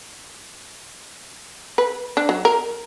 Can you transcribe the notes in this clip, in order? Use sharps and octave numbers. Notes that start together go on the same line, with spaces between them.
B4
D4
F#3
A#4